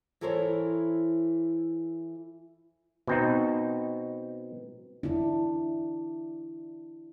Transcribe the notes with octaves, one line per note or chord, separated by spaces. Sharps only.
E3 E4 A4 A#4 C5 C#5
B2 C4 D#4
D4 E4